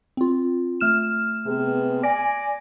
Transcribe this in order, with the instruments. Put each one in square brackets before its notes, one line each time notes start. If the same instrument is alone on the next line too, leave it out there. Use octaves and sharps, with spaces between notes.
[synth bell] C4 F4
A3 F6 E7
[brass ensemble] C3 B3 G#4
[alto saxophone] D5 [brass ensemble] G#5 [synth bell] A#6